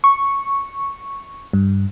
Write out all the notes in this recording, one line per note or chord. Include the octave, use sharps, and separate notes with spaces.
C#6
G2